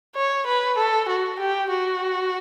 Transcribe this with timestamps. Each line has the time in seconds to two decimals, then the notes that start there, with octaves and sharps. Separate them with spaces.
0.15 C#5
0.47 B4
0.78 A4
1.09 F#4
1.40 G4
1.70 F#4